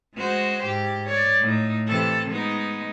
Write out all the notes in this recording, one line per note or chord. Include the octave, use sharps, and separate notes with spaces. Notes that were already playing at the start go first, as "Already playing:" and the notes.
G#3 F#4 C5
G#2 G4
C#5 D5
A2 D#4
C3 E3 A4
G#3 B3 D#4